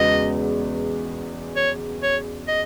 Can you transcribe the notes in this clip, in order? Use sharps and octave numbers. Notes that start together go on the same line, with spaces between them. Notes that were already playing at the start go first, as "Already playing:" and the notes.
Already playing: E2 C#3 G#3 B3 F#4 D#5
C#5
C#5
D#5